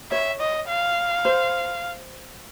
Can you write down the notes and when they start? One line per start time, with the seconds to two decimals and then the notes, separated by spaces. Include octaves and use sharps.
0.11 C#5 E5
0.40 D#5
0.68 F5
1.25 C5